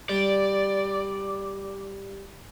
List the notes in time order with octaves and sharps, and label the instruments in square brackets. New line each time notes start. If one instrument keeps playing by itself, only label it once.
[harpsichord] G3 [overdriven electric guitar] D5